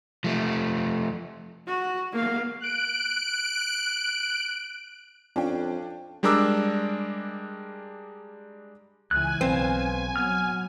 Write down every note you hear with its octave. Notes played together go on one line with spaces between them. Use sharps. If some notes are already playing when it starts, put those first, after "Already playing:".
F3 A3
F#4
A#3 F5
F#6 D7
F2 C#4 D4 F4 G5
G3 G#3 D4 A#4 D6 E6
C#2 E3 G#5 F#6
B1 C4 B4 C5 F5
F#3 B3 F6